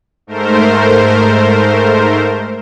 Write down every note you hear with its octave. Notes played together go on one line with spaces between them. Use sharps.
G#2 A3 A#4 C5